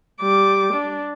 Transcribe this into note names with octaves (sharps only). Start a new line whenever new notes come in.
G3 D6
D4